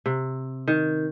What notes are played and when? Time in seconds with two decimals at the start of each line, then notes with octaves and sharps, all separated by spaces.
0.06 C3
0.68 D#3